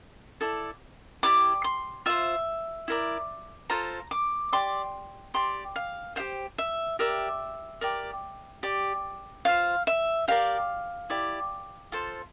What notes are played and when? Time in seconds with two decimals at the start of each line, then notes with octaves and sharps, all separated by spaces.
0.41 E4 A4 D5
1.23 E4 G4 D5 D6
1.64 C6
2.06 F4 C5 E5
2.88 E4 A#4 D5
3.69 F4 A4 C5 A#5
4.11 D6
4.53 G4 D5 C6
5.34 G4 D5 C6
5.76 F5
6.16 G4 C5 F5
6.58 E5
6.99 G4 A#4 D5 E5
7.81 G4 A#4 D5
8.63 G4 D5
9.45 F4 C5 F5
9.87 E5
10.28 G4 A#4 D5 F5
11.10 E4 G4 D5
11.92 F4 A4 C5